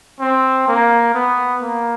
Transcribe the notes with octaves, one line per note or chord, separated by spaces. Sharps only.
C4
A#3
B3
A#3